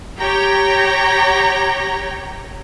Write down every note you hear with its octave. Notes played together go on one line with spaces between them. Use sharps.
G4 C#5 G5 A#5